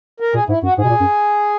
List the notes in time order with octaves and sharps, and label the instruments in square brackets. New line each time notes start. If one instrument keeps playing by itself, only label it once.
[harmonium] A#4
[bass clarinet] A#2 [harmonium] G#4
[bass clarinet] G#2 [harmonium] E4
[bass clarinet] F#2 [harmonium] F#4
[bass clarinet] G#2 [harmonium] G#4
[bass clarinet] B2
A#2
F#2